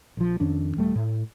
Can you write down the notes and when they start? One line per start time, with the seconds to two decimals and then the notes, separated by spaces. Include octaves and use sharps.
0.17 A#1 F3
0.40 F2 D#3 C#4 D4
0.77 D#1 G3 A3
0.95 A2